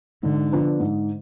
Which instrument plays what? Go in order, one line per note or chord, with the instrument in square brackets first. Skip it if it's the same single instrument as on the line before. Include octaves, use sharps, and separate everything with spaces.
[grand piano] G#2 [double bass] D3
[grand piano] F3 B3 D4
G#2